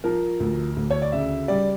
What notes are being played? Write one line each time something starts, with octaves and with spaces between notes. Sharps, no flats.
F3 A#4
D2
D2
C#5
D5
C#3 E5
G3 D5